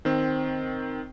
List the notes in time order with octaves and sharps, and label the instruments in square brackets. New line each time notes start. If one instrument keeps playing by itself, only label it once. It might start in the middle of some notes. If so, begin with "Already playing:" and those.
[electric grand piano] D#3 C4